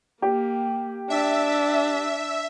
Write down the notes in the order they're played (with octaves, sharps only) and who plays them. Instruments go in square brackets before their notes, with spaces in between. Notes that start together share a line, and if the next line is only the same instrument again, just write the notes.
[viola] A#3 [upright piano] G4
[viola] D4 [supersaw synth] E5